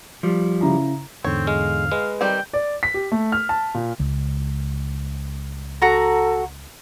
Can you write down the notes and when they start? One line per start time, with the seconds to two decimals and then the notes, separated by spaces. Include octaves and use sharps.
0.23 F3 G3
0.61 C#3 E4 A#5
1.25 E2 G#2 D3 C4 C#5
1.47 G#3 F5
1.92 G#3 B4
2.21 D#3 G3 C4 G5
2.53 D5
2.83 B6
2.94 G4
3.12 A3
3.32 F6
3.49 A5
3.74 A#2
4.00 C#2
5.82 F#4 A4 A#5